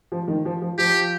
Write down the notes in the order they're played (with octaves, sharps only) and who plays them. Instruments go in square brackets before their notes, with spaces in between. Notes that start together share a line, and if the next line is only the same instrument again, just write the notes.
[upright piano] F3
D#3
F3
F3
[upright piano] F3 [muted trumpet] G4